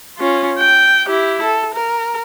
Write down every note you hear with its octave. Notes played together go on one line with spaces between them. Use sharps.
C#4 F4
G5
E4 G4
A4
A#4